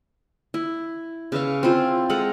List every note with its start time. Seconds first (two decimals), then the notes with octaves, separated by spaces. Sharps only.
0.54 E4
1.32 C#3 B4 E5 F5
1.63 C4 E4 F4 C5
2.10 G#3 A4 F5 F#5